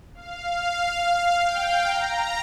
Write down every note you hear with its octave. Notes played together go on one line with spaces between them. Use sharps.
F5
G5
A#5